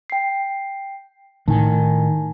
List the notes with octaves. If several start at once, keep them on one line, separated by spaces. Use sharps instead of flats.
G5 C7
A2 D#3 G#5 A5